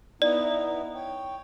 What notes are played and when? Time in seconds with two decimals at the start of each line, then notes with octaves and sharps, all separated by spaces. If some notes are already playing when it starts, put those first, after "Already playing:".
0.22 B3 D#4 E4 D5
0.95 C#5 G5